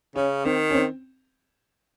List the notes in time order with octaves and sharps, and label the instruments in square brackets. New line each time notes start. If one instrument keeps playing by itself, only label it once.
[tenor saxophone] C#3 [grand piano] C#4
[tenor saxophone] D#3 [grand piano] C4
[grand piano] C#4
C4